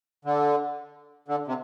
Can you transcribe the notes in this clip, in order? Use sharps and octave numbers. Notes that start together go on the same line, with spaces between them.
D3
D3
C3